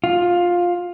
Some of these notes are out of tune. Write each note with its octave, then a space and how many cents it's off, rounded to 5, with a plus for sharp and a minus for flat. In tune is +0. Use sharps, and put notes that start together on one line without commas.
F4 +10